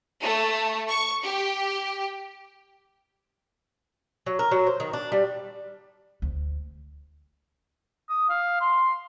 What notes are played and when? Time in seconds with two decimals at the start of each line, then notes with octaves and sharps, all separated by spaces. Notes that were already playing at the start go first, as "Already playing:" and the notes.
0.23 A3
0.89 C#6
1.23 G4
4.26 F#3
4.39 A#4
4.51 F#3
4.67 C5
4.80 D#3
4.93 D4
5.12 G3
6.22 D2
8.10 D#6
8.29 F5
8.61 C6